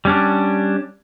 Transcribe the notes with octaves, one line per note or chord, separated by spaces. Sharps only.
G3 C#4 D4